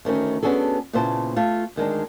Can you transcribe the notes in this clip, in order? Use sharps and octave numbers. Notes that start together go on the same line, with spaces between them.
D2 D#3 A3 C#4
B3 C#4 D4 F#4 G#4 A4
A#2 C#3 B3 E4 C5 A5
A3 F4
D2 D#3 G#3 D4